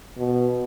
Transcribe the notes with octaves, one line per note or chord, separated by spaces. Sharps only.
B2